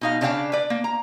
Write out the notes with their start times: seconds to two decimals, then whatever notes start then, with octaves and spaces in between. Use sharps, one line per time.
0.01 B2 D#4 F5
0.21 C#3 D4 C#5 F5 G5 A5
0.52 B4 D5
0.70 A#3
0.84 A#5